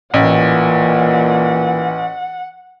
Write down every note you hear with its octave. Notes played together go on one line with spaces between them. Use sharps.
A1 A#2 E3 F#5